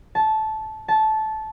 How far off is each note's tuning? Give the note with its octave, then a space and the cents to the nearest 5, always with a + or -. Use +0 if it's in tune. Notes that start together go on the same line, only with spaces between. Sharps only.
A5 -15
A5 -15